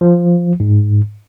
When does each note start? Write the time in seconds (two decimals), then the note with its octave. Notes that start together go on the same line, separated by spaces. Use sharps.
0.01 F3
0.60 G#2